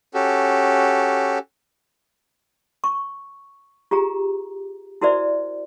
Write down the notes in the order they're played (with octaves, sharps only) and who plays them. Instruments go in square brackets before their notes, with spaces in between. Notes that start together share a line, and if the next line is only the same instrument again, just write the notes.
[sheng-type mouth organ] C#4 F#4 G4 A4
[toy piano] C#6
F4 G4 G#4 A#5
E4 F#4 A#4 C5 D5 E5